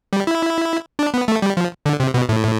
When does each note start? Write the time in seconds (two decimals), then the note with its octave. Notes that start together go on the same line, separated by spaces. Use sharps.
0.13 G3
0.27 E4
0.99 D4
1.14 B3
1.28 A3
1.42 G3
1.57 F3
1.86 D3
2.00 C3
2.14 B2
2.29 A2